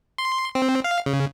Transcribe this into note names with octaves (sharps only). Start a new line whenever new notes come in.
C6
C4
F5
C#3